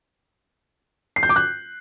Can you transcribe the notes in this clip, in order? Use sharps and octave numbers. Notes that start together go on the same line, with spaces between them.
C7
G6
D6
F#6